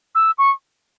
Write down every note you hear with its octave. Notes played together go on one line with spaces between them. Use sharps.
E6
C#6